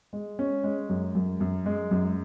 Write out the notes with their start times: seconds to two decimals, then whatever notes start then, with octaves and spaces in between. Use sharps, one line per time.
0.13 G#3
0.39 C#4
0.64 G#3
0.89 F#2
1.15 F#2
1.40 F#2
1.66 G#3
1.91 F#2